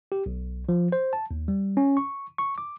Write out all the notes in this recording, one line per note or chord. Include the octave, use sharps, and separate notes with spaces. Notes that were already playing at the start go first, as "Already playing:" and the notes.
G4
B1
F3
C5
A5
D#2
G3
C#4
C#6
C#6
D6